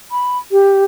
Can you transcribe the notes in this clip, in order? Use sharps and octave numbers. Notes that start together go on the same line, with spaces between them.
B5
G4